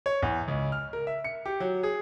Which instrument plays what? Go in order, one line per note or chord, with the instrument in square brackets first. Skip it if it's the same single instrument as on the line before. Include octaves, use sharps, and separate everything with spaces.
[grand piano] C#5
E2
C#2
F6
A#4
E5
C#7
G4
F#3
G#4